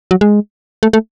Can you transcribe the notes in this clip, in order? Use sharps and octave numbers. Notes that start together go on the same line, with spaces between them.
F#3
G#3
A3
A3